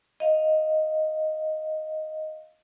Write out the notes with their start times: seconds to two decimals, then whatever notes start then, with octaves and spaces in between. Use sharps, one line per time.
0.20 D#5 F5